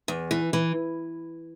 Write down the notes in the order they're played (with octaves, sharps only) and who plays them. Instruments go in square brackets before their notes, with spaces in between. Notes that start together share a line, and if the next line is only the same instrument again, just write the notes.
[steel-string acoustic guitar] E2
E3
E3